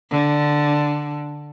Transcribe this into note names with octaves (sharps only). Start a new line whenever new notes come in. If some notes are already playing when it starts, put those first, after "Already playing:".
D3